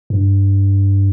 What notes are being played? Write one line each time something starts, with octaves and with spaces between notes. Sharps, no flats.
G2